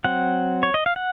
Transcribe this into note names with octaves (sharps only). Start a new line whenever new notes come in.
F#3 C4 F#5
C#5
D#5
F5
F#5